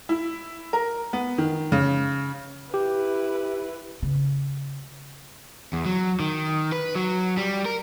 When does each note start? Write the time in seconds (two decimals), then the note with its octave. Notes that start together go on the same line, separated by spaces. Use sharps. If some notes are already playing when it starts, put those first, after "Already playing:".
0.09 E4
0.73 A#4
1.13 B3
1.38 D#3
1.72 C#3
2.74 E4 G4 B4
4.02 C#3
5.73 E2
5.85 F#3
6.20 D#3
6.72 B4
6.95 F#3
7.37 G3
7.65 A#4